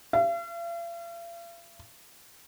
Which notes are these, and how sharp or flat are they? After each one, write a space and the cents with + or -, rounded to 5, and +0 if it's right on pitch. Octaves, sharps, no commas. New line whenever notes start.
F5 -45